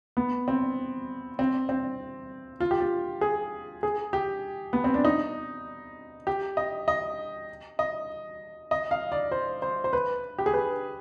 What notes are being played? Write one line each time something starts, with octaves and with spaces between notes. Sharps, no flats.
B3
C4
C4
C4
F4
G4
F4
G#4
G#4
G4
B3
C4
D4
D#4
G4
D#5
D#5
D#5
D#5
F5
D5
C5
C5
C5
B4
G4
G#4
B4